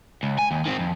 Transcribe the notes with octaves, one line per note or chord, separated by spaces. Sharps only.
C#2
G#5
D#2
D#3 C4
F2